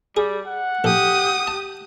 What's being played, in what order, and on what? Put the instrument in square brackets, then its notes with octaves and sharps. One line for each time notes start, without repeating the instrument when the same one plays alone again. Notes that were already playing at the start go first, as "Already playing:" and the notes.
[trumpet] G3 [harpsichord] G#4
[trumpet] F#5
[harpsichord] A#1 A4 [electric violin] G4 D#6
[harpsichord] A5